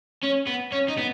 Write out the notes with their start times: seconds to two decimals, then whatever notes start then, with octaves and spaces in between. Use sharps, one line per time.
0.23 C#4
0.47 B3
0.72 C#4
0.88 D#4
0.98 B3